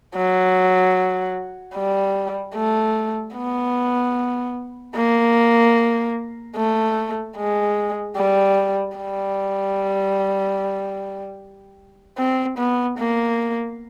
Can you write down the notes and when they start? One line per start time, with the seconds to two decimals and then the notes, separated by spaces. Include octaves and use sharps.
0.15 F#3
1.75 G3
2.55 A3
3.35 B3
4.95 A#3
6.56 A3
7.37 G#3
8.17 G3
8.97 G3
12.18 C4
12.58 B3
12.98 A#3